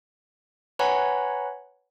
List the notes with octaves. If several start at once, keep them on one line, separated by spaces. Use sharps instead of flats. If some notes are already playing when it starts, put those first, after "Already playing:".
B4 C#5 F#5 G#5 A#5 B5